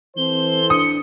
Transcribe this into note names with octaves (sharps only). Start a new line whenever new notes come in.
E3 C4 A4 C5 G7
D4 D#6 C#7